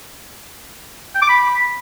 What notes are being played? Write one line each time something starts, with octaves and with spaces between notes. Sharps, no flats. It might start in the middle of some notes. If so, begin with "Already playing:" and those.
G5
D6
B5